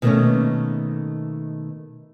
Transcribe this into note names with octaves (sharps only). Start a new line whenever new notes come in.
B2 D#3 G3 A3 A#3 C#4